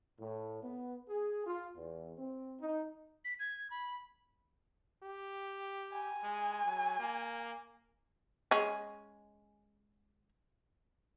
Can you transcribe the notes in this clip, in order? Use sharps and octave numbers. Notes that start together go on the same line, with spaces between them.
A2
B3
G#4
F4
E2
C4
D#4
B6
G#6
B5
G4
G#5
G#3
F#3
A#3
G#3 C#4